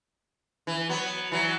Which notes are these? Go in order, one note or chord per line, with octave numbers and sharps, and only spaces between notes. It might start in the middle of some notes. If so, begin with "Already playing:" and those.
E3
F#3 B3
E3 F#3